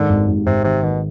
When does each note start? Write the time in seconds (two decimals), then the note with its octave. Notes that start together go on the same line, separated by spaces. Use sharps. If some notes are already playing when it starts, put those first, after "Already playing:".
Already playing: G#2 D3 D#3
0.09 G#1
0.28 G#1
0.46 G#1 C3
0.64 C3 D#3
0.83 B2 D#3